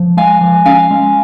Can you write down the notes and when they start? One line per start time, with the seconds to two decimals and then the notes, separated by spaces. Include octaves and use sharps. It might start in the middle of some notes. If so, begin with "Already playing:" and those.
Already playing: F3
0.17 G#3 F5 G#5
0.41 F3
0.65 C#4 F5 G#5
0.91 G#3